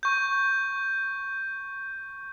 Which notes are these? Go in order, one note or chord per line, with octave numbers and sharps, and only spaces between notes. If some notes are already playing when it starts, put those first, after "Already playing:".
C#6 G6